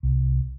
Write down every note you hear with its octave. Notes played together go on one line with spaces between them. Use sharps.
C2